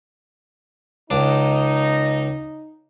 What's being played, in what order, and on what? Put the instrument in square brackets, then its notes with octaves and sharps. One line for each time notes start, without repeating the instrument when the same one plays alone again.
[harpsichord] C#2 D4 [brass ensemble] D#4